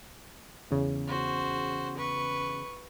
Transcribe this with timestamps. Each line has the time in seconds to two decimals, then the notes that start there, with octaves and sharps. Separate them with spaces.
0.71 E2 C#3
1.07 F#4 C5
1.97 B4 C#6